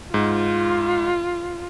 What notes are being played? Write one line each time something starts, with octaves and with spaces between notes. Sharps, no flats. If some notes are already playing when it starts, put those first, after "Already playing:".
G#2 F4